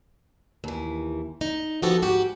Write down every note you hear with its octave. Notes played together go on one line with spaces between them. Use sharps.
D#2 E3
D#4
F3 B3 F#4 G4 A4
G#2 F#4 G4